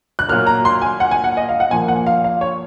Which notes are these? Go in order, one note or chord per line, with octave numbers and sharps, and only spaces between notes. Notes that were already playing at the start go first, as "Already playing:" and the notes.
F#6
A#2 F#3 A#3 F6
A#5
C6
G#5
F#5
G#5
F#5
D#5
F5
F#5
A#2 F3 A#3 G#5
F#5
F5
F5
C#5